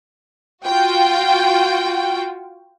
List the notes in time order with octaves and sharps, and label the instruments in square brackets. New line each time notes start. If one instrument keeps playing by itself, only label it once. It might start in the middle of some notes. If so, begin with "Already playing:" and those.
[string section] F4 F#4 G5